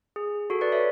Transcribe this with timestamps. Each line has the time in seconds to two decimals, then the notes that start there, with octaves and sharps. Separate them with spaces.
0.16 G#4
0.50 F#4 A4
0.61 B4 D5
0.72 C#5 E5